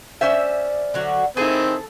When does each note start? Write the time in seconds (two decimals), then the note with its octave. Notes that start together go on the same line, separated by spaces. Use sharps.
0.21 C#4 C5 D5 E5
0.94 D3 F#3 F#4
1.37 D#3 C4 E4 G#4 A4